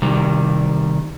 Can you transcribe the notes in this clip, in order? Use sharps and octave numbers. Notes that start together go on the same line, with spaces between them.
C3 D#3 G3